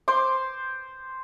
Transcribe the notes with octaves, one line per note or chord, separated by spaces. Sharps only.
C5 C6 D6